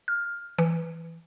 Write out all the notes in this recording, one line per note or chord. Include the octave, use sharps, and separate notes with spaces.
F6
E3